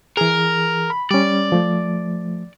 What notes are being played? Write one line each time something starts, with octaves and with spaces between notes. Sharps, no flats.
E3 G#4 A#4
B5
G3 C#4 D5
F3 A3